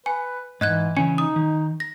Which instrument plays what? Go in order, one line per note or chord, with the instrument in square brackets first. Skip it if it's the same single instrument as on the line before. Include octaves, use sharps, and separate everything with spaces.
[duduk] B4 [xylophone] G#5
[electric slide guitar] G#2 [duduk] E3 [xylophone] D#5 F#6 G#6
[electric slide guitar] C#3 E3 C#4 [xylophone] G#5
[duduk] D#4 [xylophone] D#6
[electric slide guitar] D#3
[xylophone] A#6